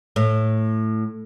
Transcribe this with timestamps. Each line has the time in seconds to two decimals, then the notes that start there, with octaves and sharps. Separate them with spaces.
0.16 A2